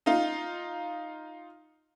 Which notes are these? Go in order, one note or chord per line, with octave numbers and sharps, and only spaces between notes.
D#4 F4